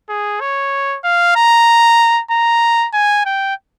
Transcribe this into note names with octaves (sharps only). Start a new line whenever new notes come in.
G#4
C#5
F5
A#5
A#5
G#5
G5